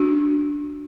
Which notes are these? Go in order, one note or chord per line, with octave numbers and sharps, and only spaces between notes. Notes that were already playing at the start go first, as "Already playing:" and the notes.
Already playing: D4 F#4